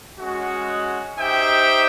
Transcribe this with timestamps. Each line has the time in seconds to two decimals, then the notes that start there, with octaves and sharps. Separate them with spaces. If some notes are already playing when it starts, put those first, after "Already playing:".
0.19 G#3 C#4 F#4
1.19 D#4 G4 C5 E5 G5